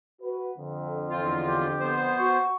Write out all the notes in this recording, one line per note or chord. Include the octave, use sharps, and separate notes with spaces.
F#4 B4
F2 D3
E2 C4 F4
G4
B3 C5
F#4 C#6